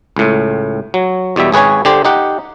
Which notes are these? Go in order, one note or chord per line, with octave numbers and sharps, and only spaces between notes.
C#2 A2
F#3
E2 B2 G3 E5
G#1 G#4 B4 C#5 G#5
D3 G4 C5
D#4 G4 F#5